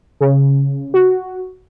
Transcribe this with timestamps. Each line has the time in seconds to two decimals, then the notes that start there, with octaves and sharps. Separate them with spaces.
0.21 C#3
0.94 F#4